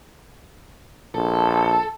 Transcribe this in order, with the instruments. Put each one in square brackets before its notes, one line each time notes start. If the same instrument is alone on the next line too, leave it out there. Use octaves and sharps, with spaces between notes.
[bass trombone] A#1 [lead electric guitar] A4